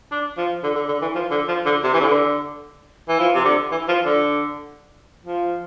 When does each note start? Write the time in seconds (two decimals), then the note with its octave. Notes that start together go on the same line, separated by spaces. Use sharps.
0.12 D4
0.37 F3
0.63 D3
0.75 D3
0.88 D3
1.01 E3
1.15 F3
1.31 D3
1.48 F3
1.65 D3
1.83 C3
1.93 E3
2.00 D3
3.08 E3
3.19 F3
3.35 C3
3.45 D3
3.71 E3
3.88 F3
4.05 D3
5.25 F3